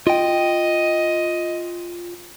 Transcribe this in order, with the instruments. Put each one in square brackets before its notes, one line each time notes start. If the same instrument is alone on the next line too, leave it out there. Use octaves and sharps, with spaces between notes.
[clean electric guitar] F4 G5 [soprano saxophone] D#5